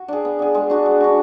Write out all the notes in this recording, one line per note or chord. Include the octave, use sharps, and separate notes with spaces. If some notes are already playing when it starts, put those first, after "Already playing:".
Already playing: F#4
D4 G#4
B3
D4 G#4
G#3
D4 F#4
G#3
D4 F#4